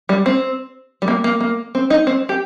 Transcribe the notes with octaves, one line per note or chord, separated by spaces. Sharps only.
G3
C4
G3
A#3
A#3
A#3
C4
D#4
C4
G4